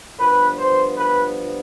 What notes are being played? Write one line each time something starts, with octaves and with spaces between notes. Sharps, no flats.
G2 F3 B3 B4
C5
B4